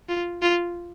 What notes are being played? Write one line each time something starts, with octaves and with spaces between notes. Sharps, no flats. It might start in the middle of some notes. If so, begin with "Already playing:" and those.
F4
F4